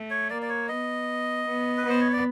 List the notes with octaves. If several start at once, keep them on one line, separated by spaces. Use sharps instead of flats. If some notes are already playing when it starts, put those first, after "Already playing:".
Already playing: A3
C#5
A#3 D5
D5
C#5
B3 D#5
B3
B4
B3 C5
C#5
D5